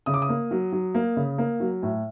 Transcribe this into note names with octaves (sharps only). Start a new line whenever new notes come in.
C#3 D#6
D6
D#6
A#3
F#3
F#3
A#3
C#3
A#3
F#3
A2